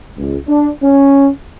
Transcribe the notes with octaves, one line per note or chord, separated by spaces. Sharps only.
C#2
D4
C#4